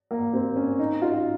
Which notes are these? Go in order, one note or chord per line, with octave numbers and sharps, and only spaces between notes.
A#3
C4
C#4
D#4
F4